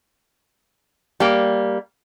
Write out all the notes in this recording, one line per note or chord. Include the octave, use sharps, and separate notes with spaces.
G3 A#3